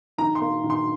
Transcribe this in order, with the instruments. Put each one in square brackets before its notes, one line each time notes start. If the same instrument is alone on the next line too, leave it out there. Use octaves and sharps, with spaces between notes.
[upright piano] D#3 A#5
C6
A#3
D#3
C6